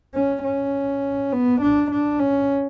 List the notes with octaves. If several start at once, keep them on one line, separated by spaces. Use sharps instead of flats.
C#4
C#4
B3
D4
D4
C#4